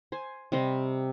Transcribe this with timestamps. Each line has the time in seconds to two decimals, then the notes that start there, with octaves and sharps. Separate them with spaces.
0.12 C5 G#5
0.52 C3 G3 C5 D#5